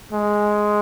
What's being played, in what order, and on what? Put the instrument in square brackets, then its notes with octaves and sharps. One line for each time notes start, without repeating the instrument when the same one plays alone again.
[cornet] G#3